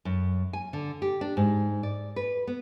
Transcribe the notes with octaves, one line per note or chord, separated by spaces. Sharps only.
F#2
G#5
D3
G4
D4
G#2
D5
B4
B3